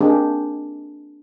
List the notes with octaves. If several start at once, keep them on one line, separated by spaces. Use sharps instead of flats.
A#3 C4 D4 D#4 G4 G#4